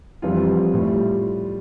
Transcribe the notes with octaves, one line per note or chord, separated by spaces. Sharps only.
F2 E3 G3 F4
A2 G3